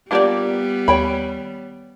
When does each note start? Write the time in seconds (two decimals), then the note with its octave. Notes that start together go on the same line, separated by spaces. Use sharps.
0.11 G3 A#3 B3 D4 F4 G4 D5 F#5
0.88 D#2 C#5 G5 B5